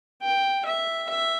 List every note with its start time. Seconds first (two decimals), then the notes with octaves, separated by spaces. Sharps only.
0.23 G5
0.66 E5
1.09 E5